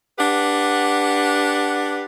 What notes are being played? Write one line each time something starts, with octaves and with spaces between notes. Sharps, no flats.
D4 G4 B4 F#5